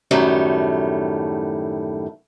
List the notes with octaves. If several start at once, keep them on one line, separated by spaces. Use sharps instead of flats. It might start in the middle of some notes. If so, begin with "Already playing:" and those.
F#2 A2 D#3 G3 A3